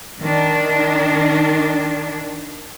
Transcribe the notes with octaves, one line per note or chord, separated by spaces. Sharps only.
D#3 D4